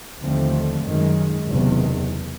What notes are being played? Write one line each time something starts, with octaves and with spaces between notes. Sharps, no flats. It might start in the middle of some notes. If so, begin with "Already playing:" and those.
D#2 D3 F3 A3 C4
F#2 D#3 G#3
F#1 E2 C3 D#3